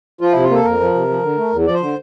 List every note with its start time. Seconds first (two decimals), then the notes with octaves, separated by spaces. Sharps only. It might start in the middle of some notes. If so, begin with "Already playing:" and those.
0.21 F3 F4
0.32 C3 E4
0.43 F4
0.50 A#3 A4
0.64 F2 A#4
0.80 F3
0.95 C3
1.09 F3
1.23 D3
1.38 A3
1.52 E2
1.67 F3 D5
1.74 C5
1.81 D3